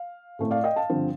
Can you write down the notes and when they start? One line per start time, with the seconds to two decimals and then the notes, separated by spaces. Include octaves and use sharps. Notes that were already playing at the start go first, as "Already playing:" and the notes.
Already playing: F5
0.39 A2 A3 C4
0.51 D5 F5
0.64 D#5 G5
0.76 F5 A5
0.89 G2 D3 F3 C4